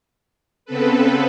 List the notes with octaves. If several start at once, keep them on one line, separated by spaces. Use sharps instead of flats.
C#3 B3 C4 A4 B4